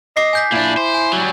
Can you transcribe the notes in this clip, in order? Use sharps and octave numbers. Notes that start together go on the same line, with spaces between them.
D#5 D6 C7
G#5 G6 B6
A#2 D4 E4
C5
G#5
F#3 G3